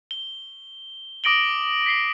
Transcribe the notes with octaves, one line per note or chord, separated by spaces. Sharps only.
G7
D6 D#6 A#6 D7 F#7 G7
B6 C7 G7